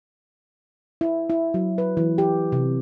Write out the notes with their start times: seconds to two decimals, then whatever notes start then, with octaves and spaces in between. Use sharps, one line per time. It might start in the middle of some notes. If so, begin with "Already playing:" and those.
1.01 E4
1.30 E4
1.54 F#3
1.78 B4
1.97 E3
2.18 G4
2.52 C3